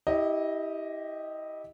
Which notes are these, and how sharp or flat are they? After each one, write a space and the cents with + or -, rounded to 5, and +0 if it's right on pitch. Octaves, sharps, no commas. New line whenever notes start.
E4 -30 G4 +0 D#5 -5